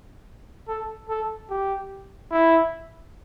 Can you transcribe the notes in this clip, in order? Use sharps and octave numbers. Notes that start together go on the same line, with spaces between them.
A4
A4
G4
E4